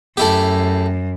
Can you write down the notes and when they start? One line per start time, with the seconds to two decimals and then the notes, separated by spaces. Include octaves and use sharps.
0.17 F#2 A3 E4 G4